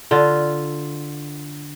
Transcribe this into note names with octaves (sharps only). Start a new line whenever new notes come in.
D3 F4